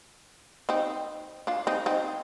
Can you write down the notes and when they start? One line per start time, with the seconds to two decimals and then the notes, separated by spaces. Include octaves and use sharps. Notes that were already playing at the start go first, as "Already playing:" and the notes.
0.69 C4 D#4
1.47 D4 F4
1.67 C4 D#4
1.86 C4 D#4